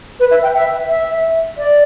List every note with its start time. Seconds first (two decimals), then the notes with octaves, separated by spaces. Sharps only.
0.20 B4
0.31 E5
0.43 G5
0.55 E5
0.89 E5
1.58 D5